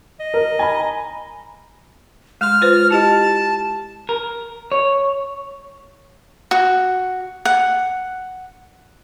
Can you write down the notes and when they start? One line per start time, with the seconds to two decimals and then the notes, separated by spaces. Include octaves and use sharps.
0.20 D#5
0.34 A#4
0.59 G#5 A#5 B5
2.41 G#3 C6 F6
2.61 F4 B4 C5
2.90 E4 G4 D#5 A5
4.09 A#4
4.72 C#5
6.51 F#4
7.45 F#5